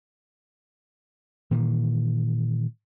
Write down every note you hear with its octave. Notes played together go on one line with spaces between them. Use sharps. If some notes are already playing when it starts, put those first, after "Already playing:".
A#2 D#3 E3